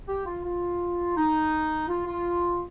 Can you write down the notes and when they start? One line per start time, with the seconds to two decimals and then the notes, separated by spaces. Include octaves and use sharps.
0.08 G4
0.26 F4
0.44 F4
1.16 D#4
1.89 F4
2.06 F4